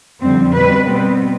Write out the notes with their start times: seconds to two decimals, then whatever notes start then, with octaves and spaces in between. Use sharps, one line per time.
0.20 F2 D3 G3 C4
0.54 B2 G3 C4 B4
0.88 B2 G3 B3 C4